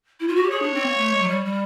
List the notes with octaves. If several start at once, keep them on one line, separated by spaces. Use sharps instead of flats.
E4
F4
F#4
G4
G#4 C#5
D4
C4
A#3
A3
G#3
F#3
G3
G3